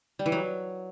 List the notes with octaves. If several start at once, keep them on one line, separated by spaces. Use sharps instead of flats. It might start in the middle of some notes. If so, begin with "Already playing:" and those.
G3
E3
F#3